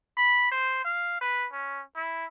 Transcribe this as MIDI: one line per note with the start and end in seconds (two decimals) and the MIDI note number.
0.17 0.49 83
0.51 0.83 72
0.84 1.21 77
1.21 1.46 71
1.52 1.81 61
1.96 2.25 64